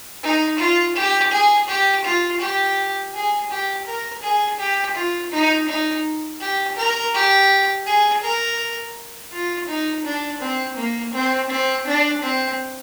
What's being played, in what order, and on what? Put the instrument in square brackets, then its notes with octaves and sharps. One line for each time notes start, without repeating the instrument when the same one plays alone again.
[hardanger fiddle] D#4
F4
G4
G#4
G4
F4
G4
G#4
G4
A#4
G#4
G4
F4
D#4
D#4
G4
A#4
G4
G#4
A#4
F4
D#4
D4
C4
A#3
C4
C4
D4
C4